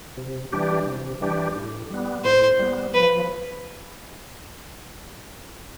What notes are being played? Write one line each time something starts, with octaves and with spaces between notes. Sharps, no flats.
C3
E3 G3 D4 G4
C3
E3 G3 D4 G4
A2
G3 B3
A2 C5
G3 B3
F3 B4